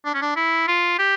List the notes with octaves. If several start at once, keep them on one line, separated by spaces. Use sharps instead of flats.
D4
C#4
D4
E4
F4
G4